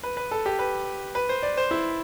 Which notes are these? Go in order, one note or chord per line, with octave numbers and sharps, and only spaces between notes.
B4
B4
A4
G4
B4
B4
C5
D5
C5
E4